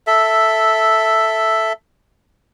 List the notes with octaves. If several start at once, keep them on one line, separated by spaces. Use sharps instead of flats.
A4 E5